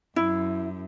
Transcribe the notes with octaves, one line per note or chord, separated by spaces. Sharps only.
F#2 E4